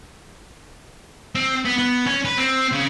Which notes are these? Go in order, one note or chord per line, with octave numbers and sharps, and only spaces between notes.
C4
B3
B3
C#4
B4
C4
C#3